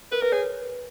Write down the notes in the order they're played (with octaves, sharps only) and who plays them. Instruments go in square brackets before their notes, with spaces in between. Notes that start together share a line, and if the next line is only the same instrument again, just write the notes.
[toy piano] A#4 [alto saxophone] B4
[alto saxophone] A#4 [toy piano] B4
[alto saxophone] G#4 [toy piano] C#5